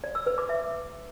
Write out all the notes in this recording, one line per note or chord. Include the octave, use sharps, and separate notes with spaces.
D5
E6
B4
D6
E5